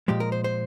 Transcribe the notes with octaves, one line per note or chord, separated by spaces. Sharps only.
A#2 F3 G#3 G4
A#4
C5
C5